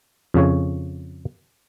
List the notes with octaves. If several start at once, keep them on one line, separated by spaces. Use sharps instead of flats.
F2 C#3 C#5